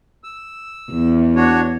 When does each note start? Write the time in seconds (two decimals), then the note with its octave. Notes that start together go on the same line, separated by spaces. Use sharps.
0.24 E6
0.92 E2
1.36 D4 F#4 C#5